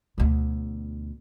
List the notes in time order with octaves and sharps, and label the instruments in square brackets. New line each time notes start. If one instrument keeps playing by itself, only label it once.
[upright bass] D2 B2